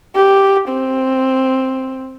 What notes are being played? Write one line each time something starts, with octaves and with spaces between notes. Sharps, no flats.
G4
C4